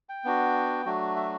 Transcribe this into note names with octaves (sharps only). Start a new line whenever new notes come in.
G5
B3 D4 F#4
F#3 A3 D4 F#4
E5